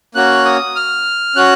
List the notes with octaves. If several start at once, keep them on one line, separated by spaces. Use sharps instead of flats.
A#3 C#4 F#4 F#6
D#6
F6
C#4 F#4 F#6